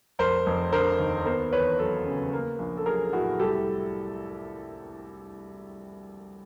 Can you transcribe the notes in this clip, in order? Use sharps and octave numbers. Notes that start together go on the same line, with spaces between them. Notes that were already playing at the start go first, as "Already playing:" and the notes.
F1 A#4 C5
F1
D3 A#4 C5
D#2
B3 A#4 C5
E2 B4 C#5
F#3 A4 B4
C#3
A#3
A#1
A4
F#3 G#4 A#4
A2 F#4 G#4
C2 G4 A4